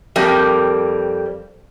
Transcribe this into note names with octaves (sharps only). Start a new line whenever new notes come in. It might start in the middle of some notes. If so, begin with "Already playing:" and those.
F2 G3 A#3 C4